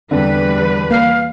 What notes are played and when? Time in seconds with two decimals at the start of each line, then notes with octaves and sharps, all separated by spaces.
0.11 E2 D3 G3 C4 B4
0.91 A#3 F5 C7